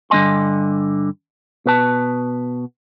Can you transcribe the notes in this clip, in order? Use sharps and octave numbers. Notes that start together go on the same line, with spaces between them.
G2 D3 A3 D#5 G#5 C6
B2 B4 A5